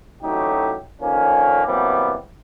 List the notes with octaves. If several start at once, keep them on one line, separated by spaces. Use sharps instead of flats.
A1 D2 F#3 A3 D#4 G4
D3 D#3 F3 A#3 C#4
C3 E3 F#3 G3 A#3 B3